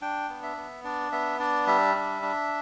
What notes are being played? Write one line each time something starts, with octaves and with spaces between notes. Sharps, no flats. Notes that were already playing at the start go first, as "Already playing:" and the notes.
D4 G5
B3
E5
B3
D4 D5
B3 E5
D4 D5
G3 E5
D4
D4